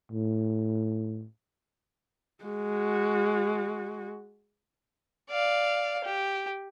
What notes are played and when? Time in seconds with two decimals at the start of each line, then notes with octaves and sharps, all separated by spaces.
0.12 A2
2.44 G#3 F#4
5.31 D5 F5
6.04 G4